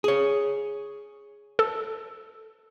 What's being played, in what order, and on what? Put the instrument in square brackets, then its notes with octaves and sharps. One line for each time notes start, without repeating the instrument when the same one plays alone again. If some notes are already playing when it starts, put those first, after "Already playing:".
[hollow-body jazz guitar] G#4 C#5
[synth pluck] A4